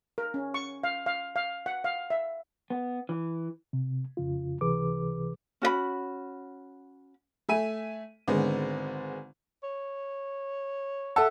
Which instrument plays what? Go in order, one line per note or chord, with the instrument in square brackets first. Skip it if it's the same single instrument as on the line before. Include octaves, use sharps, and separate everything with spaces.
[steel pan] A#4
C#4
C#6
F5
F5
F5
F#5
F5
E5
[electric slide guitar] B3
E3
[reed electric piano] C3
F2 C#3 F4
C#2 C3 E3 G#4 B4 D6
[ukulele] C#4 F#4 D5 B5
[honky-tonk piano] A3 E5 G#5 D#7
G#1 D3 G#3 B3
[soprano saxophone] C#5
[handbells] A4 E5 F#5 [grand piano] A5 E6